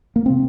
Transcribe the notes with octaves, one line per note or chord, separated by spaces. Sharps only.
A#3
C3 C4